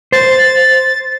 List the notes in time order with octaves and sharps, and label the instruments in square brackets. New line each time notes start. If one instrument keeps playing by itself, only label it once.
[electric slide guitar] C5 [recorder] A6